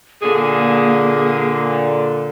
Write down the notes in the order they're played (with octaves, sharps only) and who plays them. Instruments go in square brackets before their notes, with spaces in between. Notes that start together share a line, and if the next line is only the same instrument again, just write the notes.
[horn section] A#2 D3 [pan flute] A#3 [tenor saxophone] G#4